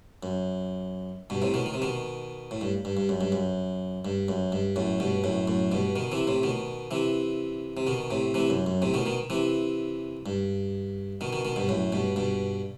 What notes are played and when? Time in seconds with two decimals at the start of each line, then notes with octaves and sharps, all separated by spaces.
0.23 F#2
1.30 G2 B2
1.42 A2 C3
1.54 B2 D#3
1.66 D#3
1.74 C3
1.82 B2 D#3
2.51 A2
2.61 G2
2.85 G2
2.97 G2
3.09 F#2
3.21 G2
3.32 F#2
4.05 G2
4.28 F#2
4.52 G2
4.76 F#2 A2
5.00 G2 B2
5.24 F#2 A2
5.48 F#2 A2
5.71 G2 B2
5.96 B2 D#3
6.12 C3 E3
6.27 A2 C3
6.43 B2 D#3
6.91 C3 E3
7.77 C3
7.87 B2 D#3
8.10 A2 C3
8.34 C3 E3
8.50 F#2
8.66 F#2
8.82 A2 C3
8.94 B2 D#3
9.06 B2 D#3
9.30 C3 E3
10.26 G2
11.21 B2 D#3
11.33 B2 D#3
11.45 B2 D#3
11.56 G2 B2
11.69 F#2 A2
11.92 G2 B2
12.16 G2 B2